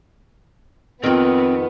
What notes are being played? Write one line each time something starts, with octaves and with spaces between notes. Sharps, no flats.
F2 D#3 B3 C4